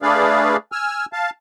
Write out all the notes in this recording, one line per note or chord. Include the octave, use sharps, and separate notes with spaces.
A3 D4 G#4 B4 D5 F5
G#5 E6 F6
F5 A5